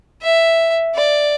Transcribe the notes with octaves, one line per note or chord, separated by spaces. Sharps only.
E5
D5